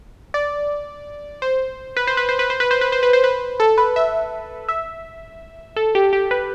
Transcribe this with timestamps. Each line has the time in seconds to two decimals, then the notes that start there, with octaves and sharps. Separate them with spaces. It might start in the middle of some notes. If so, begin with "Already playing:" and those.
0.34 D5
1.42 C5
1.96 B4
2.07 C5
2.17 B4
2.29 C5
2.39 B4
2.50 C5
2.60 B4
2.71 C5
2.81 B4
2.92 C5
3.03 B4
3.13 C5
3.24 B4
3.60 A4
3.78 B4
3.96 E5
4.69 E5
5.76 A4
5.95 G4
6.13 G4
6.31 B4